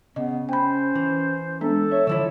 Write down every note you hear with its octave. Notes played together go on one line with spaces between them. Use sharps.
C#3 B3 D#5
C#4 C5 G5 B5
E3
G#3 B3 D4 A4
C#5 E5
D3 E3 F3 E4 C#5 E6